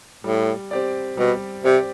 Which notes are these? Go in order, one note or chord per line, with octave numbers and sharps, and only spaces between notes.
A2 G3
C4 G4 D5
B2 G3
C3 C4 G4 D5